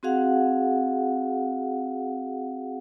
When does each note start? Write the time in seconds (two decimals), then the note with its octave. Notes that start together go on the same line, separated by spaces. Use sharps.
0.03 C4 F#4 G#4 F5 F#5